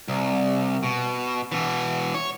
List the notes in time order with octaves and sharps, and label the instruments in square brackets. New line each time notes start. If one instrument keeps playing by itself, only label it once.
[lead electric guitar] C2
B2
B2 E3
C#5